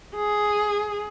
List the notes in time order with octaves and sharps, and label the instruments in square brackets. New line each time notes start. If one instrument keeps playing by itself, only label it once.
[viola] G#4